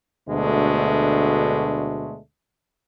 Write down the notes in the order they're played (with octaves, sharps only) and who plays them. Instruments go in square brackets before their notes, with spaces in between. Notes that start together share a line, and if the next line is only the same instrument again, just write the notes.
[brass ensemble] D2 B2 G#3 A3 D4